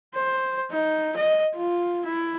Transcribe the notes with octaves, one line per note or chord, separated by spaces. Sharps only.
C5
D#4
D#5
F4
E4